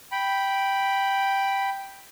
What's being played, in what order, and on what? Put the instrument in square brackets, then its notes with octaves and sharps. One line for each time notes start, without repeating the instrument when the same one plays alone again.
[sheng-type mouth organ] G5 B5